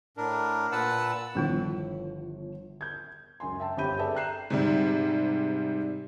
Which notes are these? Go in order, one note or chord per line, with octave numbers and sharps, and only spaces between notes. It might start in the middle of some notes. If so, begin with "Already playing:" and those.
A2 D4 A#4
A#2 B4 F#5 A5 E6
G1 D3 D#3 F3 B3 E4
G6 G#6
C#2 F#2 G#5 C6
E5 G5 A5
G1 C4 G4 B5 G6 D#7
G#4 A4 B4 D5 E5 A5
G5 A#5 F#6 C7 E7
G#2 C3 G3